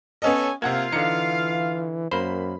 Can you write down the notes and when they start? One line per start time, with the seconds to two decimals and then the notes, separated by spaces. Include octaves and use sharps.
0.22 B3 C#4 A4 C#5 D#5 G#5
0.62 C3 A#3 F4 F5 F#5 G#6
0.92 D3 E3 D#4 C#7
2.11 F#2 A#3 C5 B5